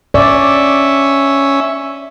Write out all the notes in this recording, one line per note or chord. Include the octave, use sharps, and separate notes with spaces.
C#4 D5 E5